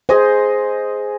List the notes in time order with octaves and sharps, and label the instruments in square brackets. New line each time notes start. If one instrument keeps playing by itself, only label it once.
[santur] G#4 D#5 G#5 [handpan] C5